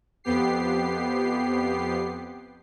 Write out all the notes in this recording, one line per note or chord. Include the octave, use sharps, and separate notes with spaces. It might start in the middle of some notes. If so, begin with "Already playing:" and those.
F2 B3 G4 C7